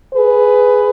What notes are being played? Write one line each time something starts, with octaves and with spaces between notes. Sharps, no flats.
G#4 B4